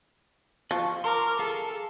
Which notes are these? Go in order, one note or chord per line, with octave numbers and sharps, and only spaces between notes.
F3 A5 C#6 F#6
A#4 C6 D6
G#4 A4 F5